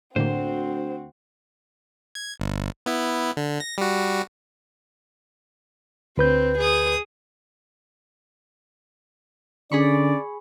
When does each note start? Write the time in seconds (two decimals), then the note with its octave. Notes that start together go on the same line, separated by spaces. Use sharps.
0.16 D2 A2 D3 A#3 C4 F#4 C5
2.15 G#6
2.40 G1
2.86 B3 E4
3.37 D3
3.60 A#6
3.78 G3 F#4
6.18 D2 C4 B4 G6
6.58 G#4 D#6
9.72 D3 C#4 G#4 D5 B5 C#6